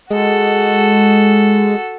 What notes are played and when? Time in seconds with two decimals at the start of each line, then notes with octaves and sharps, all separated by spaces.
0.10 G#3 F#4 A4